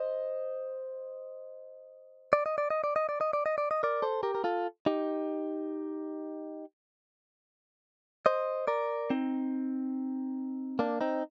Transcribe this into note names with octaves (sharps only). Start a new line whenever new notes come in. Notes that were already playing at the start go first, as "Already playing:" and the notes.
Already playing: C5 D#5
D5
D#5
D5
D#5
D5
D#5
D5
D#5
D5
D#5
D5
D#5
A#4 D5
A4 C5
G4 A#4
A#4
F4 A4
D#4 G4
C5 D#5
A#4 D5
C4 D#4
A#3 D4
C4 D#4